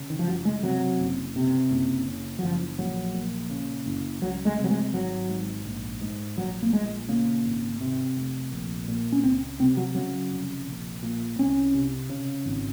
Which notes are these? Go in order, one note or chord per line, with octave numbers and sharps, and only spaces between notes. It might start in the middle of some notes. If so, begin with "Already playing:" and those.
Already playing: C#3
D#3
F3
F#1 F#3
G#3
C3 F#3
F#1
C3
F#1
C#3
F#3
F#1 F3
A#1 F#3
A#2
C#3
F#1
C#2 F#3
G#3
C3
F#3
G#3
G#1 F#3
G#2
A#1
G#2
A#1 F#3
A#3
A#2 G#3
C#3 A#3
G#1
C3
F1
A#1
A#2
C#4
C#2 C4
C3 C4
F#3
C#3 F#3
F1
A#1
A#2
C2 C#4
C3
C#3
G#1